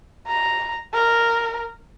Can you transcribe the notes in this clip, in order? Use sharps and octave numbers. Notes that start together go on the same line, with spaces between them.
A#5
A#4